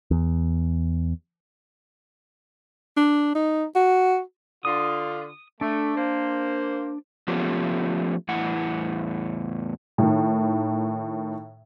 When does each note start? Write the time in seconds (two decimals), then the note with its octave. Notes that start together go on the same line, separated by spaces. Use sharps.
0.11 E2
2.97 D4
3.35 D#4
3.76 F#4
4.65 D3 F4 D#6
5.61 A3 D4
5.96 A#3 C5
7.28 F3 A3 B3 C#4 F4 G4
8.28 E2 A2 E4 F#5
9.98 A2 D#3